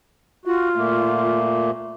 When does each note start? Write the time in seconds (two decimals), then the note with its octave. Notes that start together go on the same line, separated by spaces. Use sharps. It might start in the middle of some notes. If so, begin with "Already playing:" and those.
0.45 F4 F#4
0.76 A#2 A3 A#3